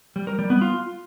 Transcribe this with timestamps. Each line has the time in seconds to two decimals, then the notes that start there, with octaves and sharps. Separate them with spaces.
0.16 G3
0.27 A#4
0.39 G3
0.50 B3
0.61 F4